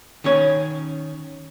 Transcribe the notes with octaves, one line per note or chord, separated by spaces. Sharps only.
D#3 C#4 C#5